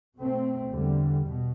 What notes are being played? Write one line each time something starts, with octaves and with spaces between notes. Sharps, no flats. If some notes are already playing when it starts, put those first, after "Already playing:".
B2 A3 C4
E2 D3 G3
B2